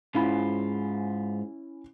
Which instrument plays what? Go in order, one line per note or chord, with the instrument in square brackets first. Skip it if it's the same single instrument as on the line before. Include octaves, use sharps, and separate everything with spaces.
[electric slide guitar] G#2 F4 [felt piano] C#4 E4 B5